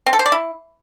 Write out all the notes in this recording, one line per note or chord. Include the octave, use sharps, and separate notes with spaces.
C4
A4
C5
D5
E4